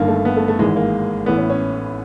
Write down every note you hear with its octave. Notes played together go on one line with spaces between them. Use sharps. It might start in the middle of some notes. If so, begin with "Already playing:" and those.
Already playing: G1 G2 D#3 A#3
A3
B3
A3
A3
G#1 G#2 E3 G#3
A#3
A1 A2 E3 B3
C#4
C#4